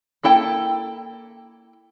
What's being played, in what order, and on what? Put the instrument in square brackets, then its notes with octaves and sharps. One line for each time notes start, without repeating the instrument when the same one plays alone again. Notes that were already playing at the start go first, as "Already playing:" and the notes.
[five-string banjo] A#3 E4 A4 G5